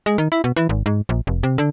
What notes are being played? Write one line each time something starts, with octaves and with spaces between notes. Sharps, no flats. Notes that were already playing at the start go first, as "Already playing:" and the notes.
G#3
D#3
E4
B2
E3
G#1
G#2
A#1
F1
C3
D3